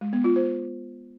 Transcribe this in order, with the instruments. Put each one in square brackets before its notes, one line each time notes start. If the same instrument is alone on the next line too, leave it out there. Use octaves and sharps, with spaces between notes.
[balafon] G#3
B3
F4
C5